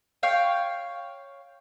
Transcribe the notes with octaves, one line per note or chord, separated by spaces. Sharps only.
C#5 F5 G5